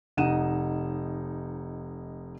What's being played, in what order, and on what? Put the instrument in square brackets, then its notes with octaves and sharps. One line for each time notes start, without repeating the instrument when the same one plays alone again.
[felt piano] F1 D#4 F#5 D#7 E7